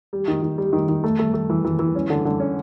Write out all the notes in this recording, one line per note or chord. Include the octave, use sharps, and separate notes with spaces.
G3
D#3
D#3
G3
D#3
D#3
A3
A3
A3
E3
E3
E3
C#4
D3
D3
C#4